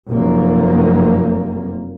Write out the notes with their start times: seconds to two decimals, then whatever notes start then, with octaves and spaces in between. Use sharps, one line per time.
0.10 F1 F#2 A#3